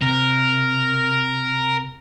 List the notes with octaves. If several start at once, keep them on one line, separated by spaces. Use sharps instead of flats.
C3 A#4